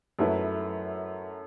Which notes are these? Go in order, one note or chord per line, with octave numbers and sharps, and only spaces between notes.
F#2 F#3 A3 E4 B4